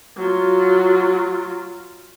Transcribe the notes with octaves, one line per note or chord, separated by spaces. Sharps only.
F#3 F4